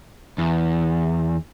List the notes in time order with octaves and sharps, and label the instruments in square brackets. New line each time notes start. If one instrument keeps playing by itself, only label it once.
[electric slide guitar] E2